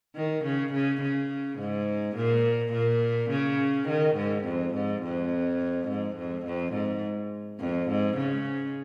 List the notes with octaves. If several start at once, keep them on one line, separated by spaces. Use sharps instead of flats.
D#3
C#3
C#3
C#3
G#2
A#2
A#2
C#3
D#3
G#2
F2
G#2
F2
G#2
F2
F2
G#2
F2
G#2
C#3